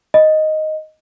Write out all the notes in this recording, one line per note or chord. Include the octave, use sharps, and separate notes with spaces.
D#5